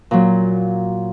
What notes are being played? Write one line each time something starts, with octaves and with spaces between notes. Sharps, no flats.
A#2 F#3